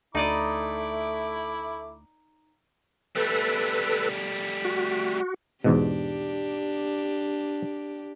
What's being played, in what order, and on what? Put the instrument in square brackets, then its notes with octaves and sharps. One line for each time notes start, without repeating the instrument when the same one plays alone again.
[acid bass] D2 [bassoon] A3 [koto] D#4 D5 D#5 [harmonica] E4 B5 D6
[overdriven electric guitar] G3 A3 [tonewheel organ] A4 B4
[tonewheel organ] F#4
[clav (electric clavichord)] E2 G#2 B2 [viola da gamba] D4 G4